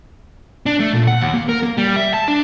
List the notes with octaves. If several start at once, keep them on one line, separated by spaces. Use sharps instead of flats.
D4
A3
A#2
F#5
D#2
A#3
A#4
A#3
G3
E5
A5
D4